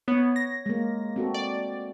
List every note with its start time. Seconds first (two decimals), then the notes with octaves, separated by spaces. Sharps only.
0.08 B3 C#5
0.36 A#6
0.66 G#3 A#3
1.16 C4 F#4 A4
1.34 D5